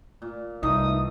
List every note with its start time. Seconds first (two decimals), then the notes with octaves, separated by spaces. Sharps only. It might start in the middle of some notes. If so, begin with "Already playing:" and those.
0.22 A#2
0.63 C2 E3 A3 D#4 D#6